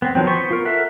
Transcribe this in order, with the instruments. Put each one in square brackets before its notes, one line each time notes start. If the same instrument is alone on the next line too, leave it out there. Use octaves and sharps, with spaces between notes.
[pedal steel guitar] B3 C4
D#3 F3 F#3 C4
B3 C5 C6 C#6
F4 A#4
A4 A#4 E5 F#5